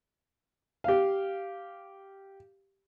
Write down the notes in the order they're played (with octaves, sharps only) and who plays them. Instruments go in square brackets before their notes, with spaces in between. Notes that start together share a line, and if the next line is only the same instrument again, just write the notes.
[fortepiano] G4 F5